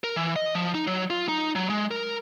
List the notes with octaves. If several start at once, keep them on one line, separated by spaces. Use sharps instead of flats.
A#4
E3
D#5
F3
D#4
F#3
F4
D#4
F#3
G#3
A#4